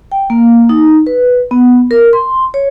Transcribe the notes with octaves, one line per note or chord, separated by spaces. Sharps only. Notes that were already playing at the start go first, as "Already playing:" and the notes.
G5
A#3
D#4
B4
B3
A#4
C6
C#5